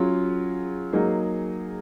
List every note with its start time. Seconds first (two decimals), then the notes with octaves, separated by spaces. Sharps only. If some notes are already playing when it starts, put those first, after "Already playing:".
Already playing: F#3 C#4 F4 G#4
0.93 F#3 A#3 D#4 G#4